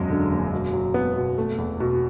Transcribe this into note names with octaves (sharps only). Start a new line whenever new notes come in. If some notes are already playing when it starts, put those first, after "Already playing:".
Already playing: E1 F#2 G#3
D3
F#1
B2
F#3
B3
B2
A3
E2
B2